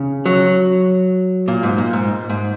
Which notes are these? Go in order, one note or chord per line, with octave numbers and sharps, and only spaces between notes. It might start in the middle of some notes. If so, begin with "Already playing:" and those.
Already playing: C#3
F#3
A#2
G#2
A#2
G#2
G#2